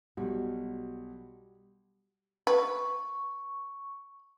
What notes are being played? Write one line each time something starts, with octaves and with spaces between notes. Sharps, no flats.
B1 G3 F#4
B4 C#6